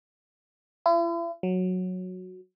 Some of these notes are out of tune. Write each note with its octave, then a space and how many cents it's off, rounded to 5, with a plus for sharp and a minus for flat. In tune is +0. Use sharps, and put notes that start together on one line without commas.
E4 +45
F#3 -10